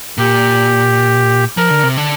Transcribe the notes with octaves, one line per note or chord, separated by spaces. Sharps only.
A#2 G4
F3 A#4
D3
C3
D3